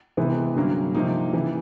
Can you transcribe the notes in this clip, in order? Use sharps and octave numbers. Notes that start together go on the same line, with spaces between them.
C3 E3 G#3 B3
G2 D3 F#3 A#3 C#4
C3 F3 A#3 D#4
C#3 E3